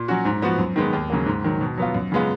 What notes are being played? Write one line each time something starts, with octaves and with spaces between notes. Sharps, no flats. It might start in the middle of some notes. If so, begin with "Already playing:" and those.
Already playing: A#2
F#3 C#4 F#4
G#2
F3 B3 F#4
F#2
D#3 G#3 B3
D#2
C#3 F#3 A#3
G#2
D#3 F#3
B2
F#3 B3 F4
F#2
C#3 G#3 B3 F4